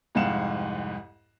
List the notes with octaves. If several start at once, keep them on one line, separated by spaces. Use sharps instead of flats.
C2 F2 G#2 F5 F#5 E7